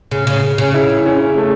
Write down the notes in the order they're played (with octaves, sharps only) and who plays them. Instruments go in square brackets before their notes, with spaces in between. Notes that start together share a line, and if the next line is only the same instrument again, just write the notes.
[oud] C#3
C#3
C#3
[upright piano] E4
C#4
A3